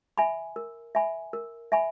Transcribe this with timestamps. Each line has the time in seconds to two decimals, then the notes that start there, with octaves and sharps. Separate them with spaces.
0.18 E5 G#5 B5
0.56 A#4
0.95 E5 G#5 B5
1.33 A#4
1.72 E5 G#5 B5